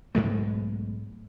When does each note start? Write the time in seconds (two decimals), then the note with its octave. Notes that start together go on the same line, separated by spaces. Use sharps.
0.15 B1 G#2 G#3 A3